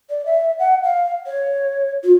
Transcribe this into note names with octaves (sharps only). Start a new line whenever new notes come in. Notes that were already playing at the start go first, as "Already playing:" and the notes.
D5
E5
F#5
F5
C#5
F4